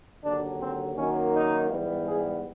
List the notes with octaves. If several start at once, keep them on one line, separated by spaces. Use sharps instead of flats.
D#2 D3 F#3 D4
C4
F#2 D#3 F#3 A#3 C#4
D#4
G#2 E3 G3 B3
G#4